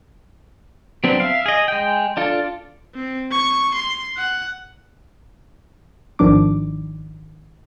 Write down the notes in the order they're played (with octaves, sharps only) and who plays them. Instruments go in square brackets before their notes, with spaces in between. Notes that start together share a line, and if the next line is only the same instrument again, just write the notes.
[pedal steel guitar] F#3 B3 C4 D4
E5 F5
G#4 D#5
G#3 G5
D4 F4 A4
[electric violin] C4
C#6
C6
F#5
[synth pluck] G#1 D#3 F3 D4 D6